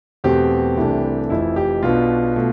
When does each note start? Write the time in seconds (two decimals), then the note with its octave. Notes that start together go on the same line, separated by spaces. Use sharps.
0.24 E2 B2 A3 C4 G4
0.77 C2 C3 E3 A3 D4
1.29 F1 F2 E3 E4
1.56 G4
1.82 B1 B2 B3 D4 F4
2.36 B2 A3